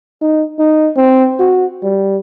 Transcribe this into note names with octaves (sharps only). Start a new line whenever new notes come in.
D#4
D#4
C4
F#4
G3